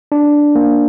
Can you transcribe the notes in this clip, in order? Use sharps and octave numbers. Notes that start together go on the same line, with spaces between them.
D4
A#3